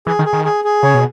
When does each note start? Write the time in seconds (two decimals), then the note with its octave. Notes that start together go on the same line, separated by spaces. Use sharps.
0.07 E3 G#4
0.19 D#3
0.26 G#4
0.33 D#3
0.45 G#4
0.64 G#4
0.83 C#3 C#5
0.94 B2